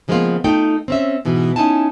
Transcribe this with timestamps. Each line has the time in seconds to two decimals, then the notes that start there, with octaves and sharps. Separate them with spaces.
0.08 C#3 F3 G#3 A#3 B3 F4
0.44 A3 D#4 F4 G5
0.88 C4 C#4 E5
1.25 G#2 B2 E3
1.56 C#4 D#4 E4 G#5 A5